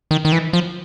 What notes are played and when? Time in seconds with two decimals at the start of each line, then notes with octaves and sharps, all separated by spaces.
0.11 D#3
0.25 D#3
0.32 E3
0.53 F3